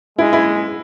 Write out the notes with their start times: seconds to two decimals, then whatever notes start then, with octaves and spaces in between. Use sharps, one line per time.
0.19 G#3 E4
0.33 E4